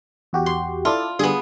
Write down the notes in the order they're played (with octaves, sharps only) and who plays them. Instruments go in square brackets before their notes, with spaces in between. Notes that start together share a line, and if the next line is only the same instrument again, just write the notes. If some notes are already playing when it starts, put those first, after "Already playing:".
[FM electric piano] E2 F#4 G4
[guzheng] C6
[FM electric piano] E4 A4 D5 [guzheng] F4
[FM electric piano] D3 G3 [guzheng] B3 G#4